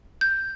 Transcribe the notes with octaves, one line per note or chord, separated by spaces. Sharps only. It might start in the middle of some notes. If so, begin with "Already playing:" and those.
G6